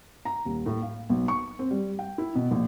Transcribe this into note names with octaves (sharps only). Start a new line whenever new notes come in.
A#5
D#1
A2
F5
B1
C#6
C4
G3
G5
E4
B2
A#1